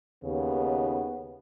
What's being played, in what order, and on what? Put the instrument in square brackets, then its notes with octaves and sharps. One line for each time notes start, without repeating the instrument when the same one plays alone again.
[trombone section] D#2 [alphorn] C#3 [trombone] B3